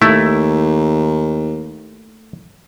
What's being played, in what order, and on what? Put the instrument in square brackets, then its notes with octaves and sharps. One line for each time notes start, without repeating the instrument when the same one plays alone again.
[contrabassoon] D#2 [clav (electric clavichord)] A3 E4